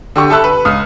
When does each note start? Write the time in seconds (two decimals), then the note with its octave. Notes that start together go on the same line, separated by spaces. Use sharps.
0.16 D3 G4 C#6
0.30 A4 E5 A5 B5 E6 F#6
0.44 B4
0.65 C#2 D#6 F6